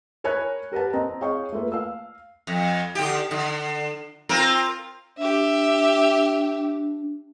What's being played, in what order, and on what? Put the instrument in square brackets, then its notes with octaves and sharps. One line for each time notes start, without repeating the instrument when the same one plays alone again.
[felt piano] A#4 C#5 G#5 B5 F#6 G#6
G4 A#4 B4 F#5 A5
C4 D#5 A#5
G#4 C#5 D#5 F5 G5 C#6
A3 A#3 F4 B4
F5 E6
[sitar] F2
D3 G4
D3
C4 F4 A#4
[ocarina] D4 [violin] G4 E5